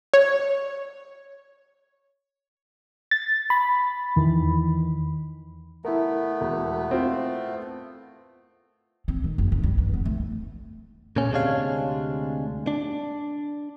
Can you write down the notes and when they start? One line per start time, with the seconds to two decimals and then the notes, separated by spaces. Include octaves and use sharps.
0.14 C#5
3.11 A6
3.50 B5
4.16 E2 D#3 E3
5.85 A3 B3 E4 A#4
6.41 E1
6.91 C4 F4
9.08 C4
9.24 D#3
9.38 F#1
9.52 C3
9.63 G3
9.78 G2
9.94 B3
10.05 A3
11.16 A#2 C#3 C#4
11.32 D2 C3 G#3 D4 C#5 F5
12.67 D4